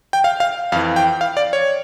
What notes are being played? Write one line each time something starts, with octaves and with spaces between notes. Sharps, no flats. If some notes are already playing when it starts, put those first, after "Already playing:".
G5
F5
F5
F2 E3 F5
G5
F5
D5
C#5